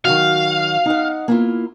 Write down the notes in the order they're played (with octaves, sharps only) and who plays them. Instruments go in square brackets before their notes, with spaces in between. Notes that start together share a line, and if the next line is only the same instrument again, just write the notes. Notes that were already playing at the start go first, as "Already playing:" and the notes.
[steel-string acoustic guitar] D#3 F#3 F#4 [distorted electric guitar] F5
[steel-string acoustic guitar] D#4 F#5
A#3 E4 F4